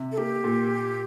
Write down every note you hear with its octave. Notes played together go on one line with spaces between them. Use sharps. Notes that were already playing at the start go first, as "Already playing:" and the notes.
Already playing: C3
A4
A#3 G4
A#2